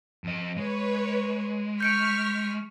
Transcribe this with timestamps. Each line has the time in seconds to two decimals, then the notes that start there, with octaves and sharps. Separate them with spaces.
0.24 F2 D#5
0.57 G#3 B4 C#5
1.80 C#6 F6 G6 B6 C#7 D7